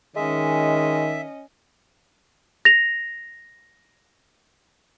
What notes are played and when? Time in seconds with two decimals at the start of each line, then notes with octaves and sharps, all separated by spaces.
0.16 D#3 G#3 C#4 D#5 E5
2.65 A#6 F7